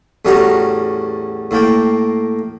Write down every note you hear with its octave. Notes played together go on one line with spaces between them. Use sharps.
E2 A2 G3 C#4 F#4 A#5
A2 A#3 G5